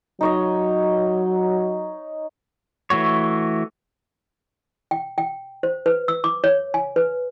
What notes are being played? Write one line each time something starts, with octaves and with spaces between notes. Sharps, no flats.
F#3 D#4 C#5 D#5
E3 A3 F#4 C#5
G5
G5
C5
B4
E6
D6
C#5
G#5
B4